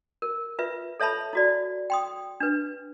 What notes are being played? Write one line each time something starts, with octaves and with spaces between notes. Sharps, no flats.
A#4
F4 B4 E5
A4 C#5 E5 A5 B5
E4 F#4 D5
G5 C6 D#6
D4 B4